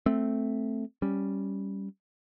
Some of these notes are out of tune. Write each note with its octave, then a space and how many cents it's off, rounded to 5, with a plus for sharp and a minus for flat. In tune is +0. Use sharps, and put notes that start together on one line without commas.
A3 +0 C4 +0
G3 +0 C#4 +0